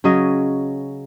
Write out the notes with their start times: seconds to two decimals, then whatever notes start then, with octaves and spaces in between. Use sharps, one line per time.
0.04 C#3 F#3 C#4 D#5